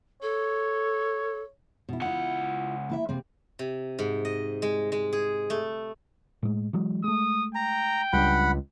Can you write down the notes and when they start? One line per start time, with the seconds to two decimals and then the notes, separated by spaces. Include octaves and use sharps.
0.22 A4 C#5
1.89 B2 E4
2.01 C#2 E4 F4 F#5
2.89 A#3 E4 E5
3.09 C3 A#3 C4
3.59 C3
3.99 G#2
4.25 D#5
4.62 G#3
4.92 G#3
5.13 G#4
5.50 A3
6.43 A2 G#3
6.73 E3 F#3 G#3
7.04 G#3 A3 D#6
7.55 G5 A#5
8.13 C#2 F#3 G3 D4 F#5 B5